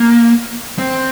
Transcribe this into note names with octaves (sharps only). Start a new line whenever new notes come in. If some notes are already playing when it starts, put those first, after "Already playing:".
Already playing: A#3
C4